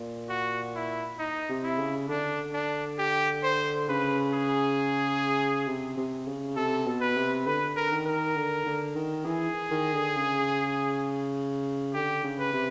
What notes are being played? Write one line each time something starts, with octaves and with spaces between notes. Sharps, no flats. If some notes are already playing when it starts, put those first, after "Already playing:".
Already playing: A#2
F#4
E4
D#4
C3
E4
C#3
D3 D4
D4
G4
C5
C#3 B4
G#4
C3
C3
C#3
C3 A4
B2
B4
C3
D3 B4
A#4
D#3
A#4
D3
D3
D#3
E3 G#4
D#3
D3
C#3
D3 G4
C#3
B4
C3